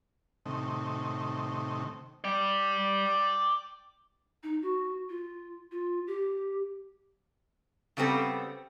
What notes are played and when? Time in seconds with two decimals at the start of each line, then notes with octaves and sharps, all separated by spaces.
0.46 A2 C3 D#3
2.24 D5 G5
4.43 D#4
4.62 F#4
5.09 F4
5.71 F4
6.07 G4
7.97 C#3 G3 B3 C4 A4